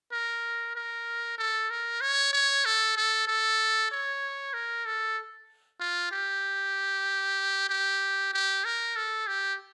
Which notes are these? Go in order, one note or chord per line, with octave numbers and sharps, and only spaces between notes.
A#4
A#4
A4
A#4
C#5
C#5
A4
A4
A4
C#5
A#4
A4
F4
G4
G4
G4
A#4
A4
G4